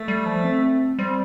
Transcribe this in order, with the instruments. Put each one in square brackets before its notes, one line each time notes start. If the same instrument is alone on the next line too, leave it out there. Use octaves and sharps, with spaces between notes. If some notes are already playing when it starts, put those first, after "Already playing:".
Already playing: [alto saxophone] A3
[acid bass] G3
F3
C4
[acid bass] G3 [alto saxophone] C4